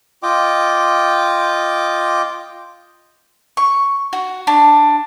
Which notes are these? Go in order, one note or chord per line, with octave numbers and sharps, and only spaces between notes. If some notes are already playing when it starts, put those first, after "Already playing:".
F4 D#5 G5 D6
C#6
F#4
D4